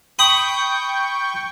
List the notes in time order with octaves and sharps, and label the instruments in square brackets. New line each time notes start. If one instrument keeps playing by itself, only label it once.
[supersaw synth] G5 C#6 G6 [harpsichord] B5 D#6